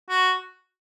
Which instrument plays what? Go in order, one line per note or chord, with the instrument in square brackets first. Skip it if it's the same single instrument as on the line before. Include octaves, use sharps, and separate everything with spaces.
[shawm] F#4